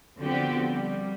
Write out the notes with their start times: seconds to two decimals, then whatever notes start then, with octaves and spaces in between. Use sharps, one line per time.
0.20 D3 F3 B3 C4 F#4 G4
0.67 G3